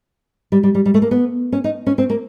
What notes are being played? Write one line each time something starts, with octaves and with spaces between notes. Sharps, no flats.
G3
G3
G3
G3
A3
A#3
B3
C#4
D#4
C#4
C4
A#3